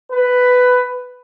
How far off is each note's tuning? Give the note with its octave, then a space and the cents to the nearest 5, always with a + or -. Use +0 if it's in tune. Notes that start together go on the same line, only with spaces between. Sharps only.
B4 +10